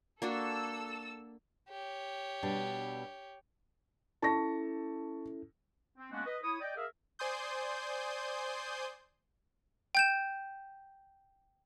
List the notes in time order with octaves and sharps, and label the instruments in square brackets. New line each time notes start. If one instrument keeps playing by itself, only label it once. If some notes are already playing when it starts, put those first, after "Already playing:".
[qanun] A#3 D4 F#4 [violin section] A4 E6
[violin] G4 C#5
[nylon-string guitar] B2 G3 D4
[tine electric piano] C#4 E4 A4 [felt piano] A5 C#6 A#6
[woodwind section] C4
G#3 A#3 B3 C#4 D4 F#4
B4 D#5
E4 C#5 D#6
D5 D#5 G5
G#4 A#4 E5 F5
[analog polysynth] C5 D5 G#5 C6 D#6 G6
[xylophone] G5 G6 E7